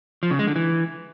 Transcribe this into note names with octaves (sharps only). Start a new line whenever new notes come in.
F3
C#3
G#3
D3
E3